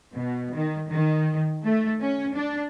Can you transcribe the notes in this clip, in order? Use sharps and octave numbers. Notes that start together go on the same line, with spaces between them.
B2
D#3
D#3
A3
C#4
D4